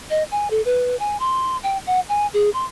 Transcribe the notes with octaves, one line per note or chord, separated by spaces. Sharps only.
D#5
G#5
A4
B4
G#5
C6
G5
F#5
G#5
G#4
C6